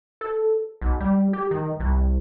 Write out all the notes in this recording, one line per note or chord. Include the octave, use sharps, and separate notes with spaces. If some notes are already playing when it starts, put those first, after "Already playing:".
A4
B1
G3
G4
D#3
C2